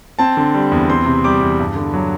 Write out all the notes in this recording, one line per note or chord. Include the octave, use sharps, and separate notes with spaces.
C4 A5
D3
G3
E2
C4 C6
C3
G3 D6
E2
G2
D3
F#3